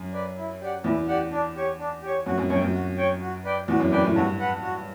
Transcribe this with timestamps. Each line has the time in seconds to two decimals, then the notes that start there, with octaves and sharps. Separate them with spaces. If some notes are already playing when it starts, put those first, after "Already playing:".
Already playing: F#2
0.13 B4 D5
0.37 E4
0.61 G4 D5 F#5
0.84 E2 E4
1.08 G4 D5 F#5
1.32 D4
1.56 G4 C#5
1.79 D4
2.02 G4 C#5
2.26 F#2 F#4
2.38 F#2
2.49 F#2 C#5
2.54 G5
2.62 F#2
2.73 F#4
2.97 C#5 G5
3.21 F#4
3.44 B4 D5 G5
3.68 E2 F#4
3.80 F#2
3.92 F#2 B4 D5 G5
4.04 A2
4.16 G2 F#4
4.39 B4 F#5
4.63 F#4